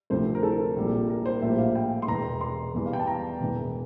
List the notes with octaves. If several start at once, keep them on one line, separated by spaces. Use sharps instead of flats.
D2 C3 F3 A3 C5
A#4
A4
A#1 A#2 G3 A#3 F4
A#4
C5
A#1 A2 G3 A#3 F4 E5
F5
G5
C6
E1 E2 E3 A#5
C6
E2 E3 G3
F5
G5
A5
A#5
E1 E2 E3